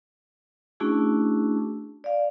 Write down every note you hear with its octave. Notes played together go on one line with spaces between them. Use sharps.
A3 C#4 D4 E4 F#4 G#4
D5 F5